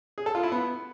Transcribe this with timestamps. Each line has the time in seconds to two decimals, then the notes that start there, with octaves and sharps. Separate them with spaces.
0.18 G#4
0.26 A4
0.35 F4
0.43 E4
0.52 B3